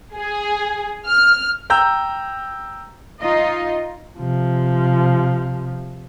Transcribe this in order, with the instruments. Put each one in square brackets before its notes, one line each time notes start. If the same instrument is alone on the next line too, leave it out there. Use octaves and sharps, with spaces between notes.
[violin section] G#4
F6
[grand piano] G5 A#5 E6 G6
[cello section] D#4 F4 D#5
[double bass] C3 F3